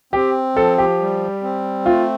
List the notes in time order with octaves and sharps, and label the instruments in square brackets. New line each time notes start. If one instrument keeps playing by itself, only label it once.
[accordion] C4 [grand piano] G4
[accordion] F3 [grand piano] A4
[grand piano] G4
[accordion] G3
C4
[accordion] A3 [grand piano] F4